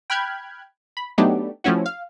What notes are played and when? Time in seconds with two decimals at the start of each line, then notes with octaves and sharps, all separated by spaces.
0.10 G5 B5 F6 F#6 G#6
0.97 B5
1.18 F#3 A3 B3 D4 D#4 G4
1.64 F3 A3 C4 C#4 E4 F#4
1.86 F5